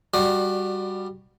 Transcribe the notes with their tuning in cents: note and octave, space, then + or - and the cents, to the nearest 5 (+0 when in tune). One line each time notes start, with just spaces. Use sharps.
G3 +0 F#4 +0 D5 +25